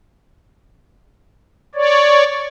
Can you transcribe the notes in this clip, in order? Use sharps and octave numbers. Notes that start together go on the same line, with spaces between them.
C#5 D5